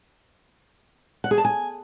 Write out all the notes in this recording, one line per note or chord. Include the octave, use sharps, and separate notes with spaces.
F#5
G#4
A5
G#5